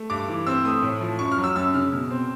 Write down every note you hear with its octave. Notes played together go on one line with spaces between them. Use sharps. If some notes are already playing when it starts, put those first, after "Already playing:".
Already playing: A3
G2 D6
E3
C4 E6
A3 D#6
A2
F3
F#2 C#6
F6
F#3
E6
F#2 E6
C#3 F6
B2
C4